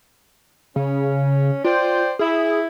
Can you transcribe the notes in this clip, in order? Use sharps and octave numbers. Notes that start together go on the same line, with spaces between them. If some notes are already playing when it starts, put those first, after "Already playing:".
C#3 C#4
F4 C5 D5 G5
E4 G#4